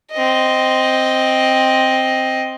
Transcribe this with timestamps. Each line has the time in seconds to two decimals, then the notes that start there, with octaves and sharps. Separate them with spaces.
0.13 C4 D#5